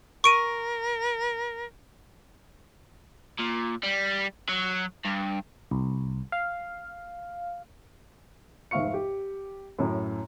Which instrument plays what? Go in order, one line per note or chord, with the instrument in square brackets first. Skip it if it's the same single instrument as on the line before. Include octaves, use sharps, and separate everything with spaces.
[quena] A#4 [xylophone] C#6 D7 D#7
[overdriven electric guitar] A#2
G3
F#3
G2
[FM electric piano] C2
F5
[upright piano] F1 G#2 E5 F5 C#6 C#7
G4
F#2 A2